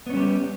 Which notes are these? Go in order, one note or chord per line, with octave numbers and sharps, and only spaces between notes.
G3 B3 C#4 G4